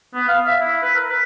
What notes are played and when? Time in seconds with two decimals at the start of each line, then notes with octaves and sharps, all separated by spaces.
0.14 B3
0.28 F5
0.46 E5
0.61 E4
0.82 B4
0.95 A#4
1.10 B4